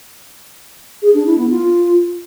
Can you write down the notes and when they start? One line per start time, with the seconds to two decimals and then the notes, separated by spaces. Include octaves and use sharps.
1.02 G#4
1.14 D4
1.26 E4
1.38 B3
1.50 F4